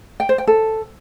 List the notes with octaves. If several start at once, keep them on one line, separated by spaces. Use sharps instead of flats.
G5
C5
G5
A4